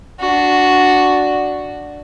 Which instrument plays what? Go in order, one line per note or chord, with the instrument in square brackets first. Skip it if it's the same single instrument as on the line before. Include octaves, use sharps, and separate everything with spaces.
[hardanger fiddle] D4 F#4